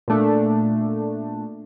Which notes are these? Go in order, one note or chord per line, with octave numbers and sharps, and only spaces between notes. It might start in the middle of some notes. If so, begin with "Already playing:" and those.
A#2 A3 D4